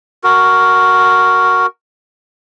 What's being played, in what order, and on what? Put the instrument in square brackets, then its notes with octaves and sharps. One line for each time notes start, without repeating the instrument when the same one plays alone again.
[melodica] F#4 A#4